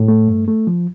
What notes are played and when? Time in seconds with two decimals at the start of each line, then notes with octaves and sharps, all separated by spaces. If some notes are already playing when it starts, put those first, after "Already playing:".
Already playing: A2
0.08 A3
0.28 G2
0.48 A3
0.67 F3